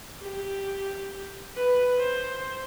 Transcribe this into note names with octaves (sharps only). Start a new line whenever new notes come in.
G4
B4
C5